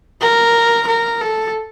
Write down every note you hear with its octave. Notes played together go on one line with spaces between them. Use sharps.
A#4
A#4
A4